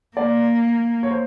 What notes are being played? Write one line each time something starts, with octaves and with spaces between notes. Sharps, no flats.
A#3 D5
C#5
C5